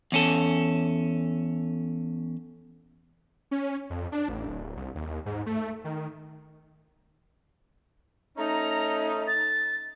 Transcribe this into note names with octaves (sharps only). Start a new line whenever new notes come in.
E2 C#4 A4
C#4
F2
D4
A1
D1
C2
D#2
G#2
A3
D#3
A3 C#4 D#4 A#5
A6